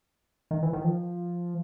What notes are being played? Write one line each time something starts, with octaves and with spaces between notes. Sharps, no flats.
D#3
E3
D#3
F3